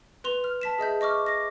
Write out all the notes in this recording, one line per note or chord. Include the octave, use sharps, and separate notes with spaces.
B4 C6 F7
F6
A5 B6 E7
G#4 D#5 E5 G6
D#5 C#6 D6 F6
D6 A#6